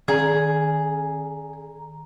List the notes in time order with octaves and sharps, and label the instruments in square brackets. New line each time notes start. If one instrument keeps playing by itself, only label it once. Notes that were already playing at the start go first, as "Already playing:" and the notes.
[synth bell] D#3 [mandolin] G#4 [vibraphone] A#5